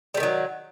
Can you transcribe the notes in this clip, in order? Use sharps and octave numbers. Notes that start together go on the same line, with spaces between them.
C3 D#3 F#3 G3